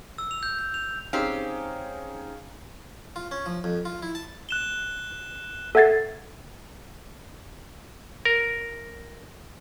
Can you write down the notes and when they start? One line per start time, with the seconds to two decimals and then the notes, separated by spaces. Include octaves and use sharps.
0.18 E6
0.31 F7
0.43 G6
0.59 G6
0.74 F7
1.13 C4 C#4 D#4 G4 G#4 F5
3.16 F4
3.31 C#4
3.46 F3
3.64 F2
3.85 F4
4.02 E4
4.15 A5
4.49 F#6 E7 G7
5.75 A4 E5 F#5 G#6 A6 C7
8.25 A#4